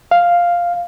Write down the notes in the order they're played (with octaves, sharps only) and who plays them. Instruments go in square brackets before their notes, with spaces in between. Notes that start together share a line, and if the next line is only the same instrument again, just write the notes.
[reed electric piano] F5